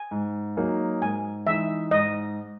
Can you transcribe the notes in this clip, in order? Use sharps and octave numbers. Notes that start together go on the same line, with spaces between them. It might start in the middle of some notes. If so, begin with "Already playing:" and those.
Already playing: G#5
G#2
F#3 A#3 D#4 G#4
G#2 G#5
E3 G#3 D#4 E5
G#2 D#5